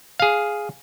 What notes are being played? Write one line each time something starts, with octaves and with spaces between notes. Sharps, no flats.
G#4 F5